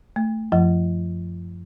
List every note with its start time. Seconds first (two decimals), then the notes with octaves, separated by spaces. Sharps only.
0.16 A3
0.52 F#2 F3